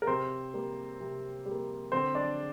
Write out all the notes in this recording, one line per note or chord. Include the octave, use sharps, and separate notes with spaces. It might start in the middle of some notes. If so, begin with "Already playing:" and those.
A#4
C3 C4 C5
G3 A#3
C3
G3
A#3
D3 C4 C5
D4 D5